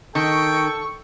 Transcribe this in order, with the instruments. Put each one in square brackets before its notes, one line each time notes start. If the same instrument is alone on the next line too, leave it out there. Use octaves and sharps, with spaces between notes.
[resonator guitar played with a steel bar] D#3 [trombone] A4 [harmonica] G5 [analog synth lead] C#6